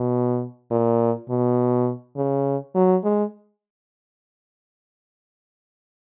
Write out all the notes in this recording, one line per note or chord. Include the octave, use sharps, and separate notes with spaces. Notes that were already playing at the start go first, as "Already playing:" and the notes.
Already playing: B2
A#2
B2
C#3
F#3
G#3